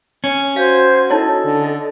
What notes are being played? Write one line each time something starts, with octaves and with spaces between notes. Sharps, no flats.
C#4
F#4 C5 F5 G6 G#6
D#4 E4 A4 C#5 D#5
D3